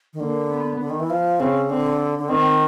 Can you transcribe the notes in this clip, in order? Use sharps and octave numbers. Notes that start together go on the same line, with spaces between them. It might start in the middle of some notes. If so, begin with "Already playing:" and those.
D#3
D3 A#3
B3
D3
D#3
E3
F3
C#3 C4
D3 C4
D3
D#3 C4